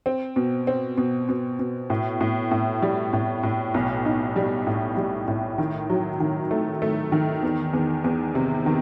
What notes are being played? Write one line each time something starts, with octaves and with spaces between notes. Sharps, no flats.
C4
B2
C4
B2
B2
B2
A2
A2
A2
G3
A2
A2
B1
D#4
G3
A2
G3
A2
D#3
F#3
D#3
A3
A3
D#3
E2
E2
E2
C3
D#3